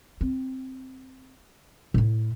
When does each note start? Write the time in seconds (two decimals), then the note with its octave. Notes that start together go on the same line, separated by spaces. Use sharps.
0.21 C4
1.94 A2 E4